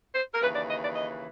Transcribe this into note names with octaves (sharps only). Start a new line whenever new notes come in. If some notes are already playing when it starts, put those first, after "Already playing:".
C5
A#4
D#2 C#3 E3 B4
D5
D#5
D5
D#5